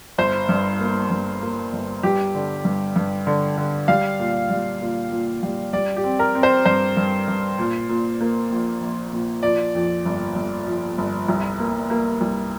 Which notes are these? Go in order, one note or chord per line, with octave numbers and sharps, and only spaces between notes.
G1 C5
G2
A#3
G2
A#3
G1
G2 G4
D3
G2
G2
D3
D3
G3 F5
A#2
G3
A#2
A#2
G3
G3 D5
G4
C4
A#4
C4
C5
G2 C5
G2
G2
A#2
A#2
A#3
A#1
A#1
A#2
F3 D5
F2
G1
G1
F3
G1
C2
A#3
A#3
C2